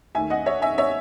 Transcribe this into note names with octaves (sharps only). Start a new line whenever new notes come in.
D#2 D#3 A3 E5 G#5
D#5 F#5
C#5 E5
E5 G#5
C#5 E5